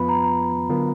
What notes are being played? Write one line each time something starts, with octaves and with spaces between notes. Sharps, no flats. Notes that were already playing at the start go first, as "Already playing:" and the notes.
Already playing: F2 F3 B3 F4 B4 B5
A#5
A#5
D3 F#3 B3 F4 A#4